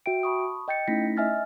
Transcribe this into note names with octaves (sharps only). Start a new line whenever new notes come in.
F#4 E5 G5 D7
A5 B5 C#6 D#6
D#5 G5 G6 A6 C#7
A3 C#4 D#4 E4 A#6 B6
D#5 E5 G#5 F6 A6